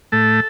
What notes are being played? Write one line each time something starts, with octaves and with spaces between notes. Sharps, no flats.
A2 A3 A4